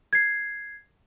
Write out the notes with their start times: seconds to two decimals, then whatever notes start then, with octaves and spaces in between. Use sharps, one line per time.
0.13 G#6 C7